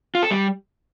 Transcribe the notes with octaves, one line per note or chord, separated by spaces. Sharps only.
F4
A4
G3